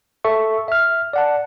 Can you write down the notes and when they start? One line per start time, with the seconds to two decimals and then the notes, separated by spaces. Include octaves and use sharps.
0.24 A4 E5 C#6
0.68 E5 F6
1.13 D5 F#5 A5